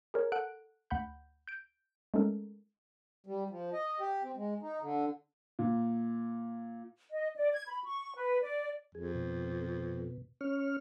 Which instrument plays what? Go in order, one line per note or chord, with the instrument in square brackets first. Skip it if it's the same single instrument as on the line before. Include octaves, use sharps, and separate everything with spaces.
[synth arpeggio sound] G#4 A#4 C#5
A4 F#5 F#6 D7
D2 F#5 B5 G6
G6 D7
G#3 A3 C#4 D#4 A4 A#4
[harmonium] G3
F3
D#5
G4
C4
G#3
D#4
D3
[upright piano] A#2
[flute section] D#5
D5
G#6
B5
C#6
B4
D5
[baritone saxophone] F2 [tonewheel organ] G#4
[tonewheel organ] B2
C#4 C#5 F6